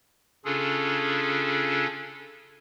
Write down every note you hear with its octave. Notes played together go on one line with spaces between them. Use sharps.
C#3 C#4 D4 F4 G#4 A4